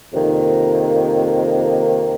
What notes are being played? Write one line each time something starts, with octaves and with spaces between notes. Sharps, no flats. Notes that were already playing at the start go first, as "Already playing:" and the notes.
F2 C3 D#3 A#3